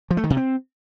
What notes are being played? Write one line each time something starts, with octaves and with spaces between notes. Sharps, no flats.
F3
A3
D#3
C3
C4